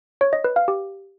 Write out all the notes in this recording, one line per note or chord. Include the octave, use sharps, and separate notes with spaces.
C#5
D#5
B4
F5
G4